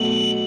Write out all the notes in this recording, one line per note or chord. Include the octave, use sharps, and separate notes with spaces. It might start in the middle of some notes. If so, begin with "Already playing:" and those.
Already playing: B2 F#3 A3 F#7
F#7